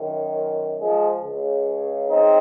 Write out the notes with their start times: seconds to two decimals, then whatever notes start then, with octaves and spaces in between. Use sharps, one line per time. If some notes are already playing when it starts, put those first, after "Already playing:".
Already playing: F#2 D#3
0.80 F3 G#3
1.23 C#2 C#3
2.08 C4 D#4